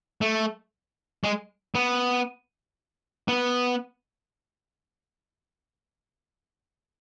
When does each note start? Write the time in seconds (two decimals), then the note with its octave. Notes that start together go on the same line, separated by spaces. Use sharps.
0.21 A3
1.24 G#3
1.75 B3
3.28 B3